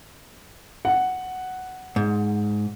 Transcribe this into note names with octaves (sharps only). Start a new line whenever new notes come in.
F#5
G#2